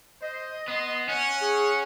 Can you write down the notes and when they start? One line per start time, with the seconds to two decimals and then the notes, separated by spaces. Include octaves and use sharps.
0.22 C5 D#5
0.68 B3 C6
1.08 C#4 F#5
1.41 G#4